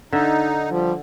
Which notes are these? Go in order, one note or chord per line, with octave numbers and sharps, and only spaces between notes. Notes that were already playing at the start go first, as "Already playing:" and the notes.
D3 D#4 E5
F3 G3